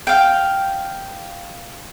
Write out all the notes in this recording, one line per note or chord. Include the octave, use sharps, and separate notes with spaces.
F5 G5